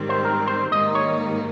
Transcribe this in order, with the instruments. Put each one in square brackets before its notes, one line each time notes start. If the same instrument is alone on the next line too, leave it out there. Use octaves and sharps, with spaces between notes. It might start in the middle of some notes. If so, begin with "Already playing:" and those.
Already playing: [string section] G#2 D#3 G3 C4
[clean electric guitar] C5
A#4
C5
[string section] G#2 D#3 G3 A#3 D#4 [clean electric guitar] D#5
[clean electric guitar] C#5